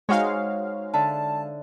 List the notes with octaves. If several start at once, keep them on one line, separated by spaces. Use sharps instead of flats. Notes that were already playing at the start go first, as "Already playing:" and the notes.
G#3 D#4 F#4 C5 C#5 F5
D3 E5 A5